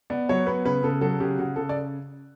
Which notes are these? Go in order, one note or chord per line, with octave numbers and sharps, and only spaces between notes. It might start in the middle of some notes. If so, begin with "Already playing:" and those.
B3 D5
F#3 C#5
B3 B4
C#3 B4
C#3 A4
F#3 A4
C#3 G4
C#3 F#4
C#3 A4
D5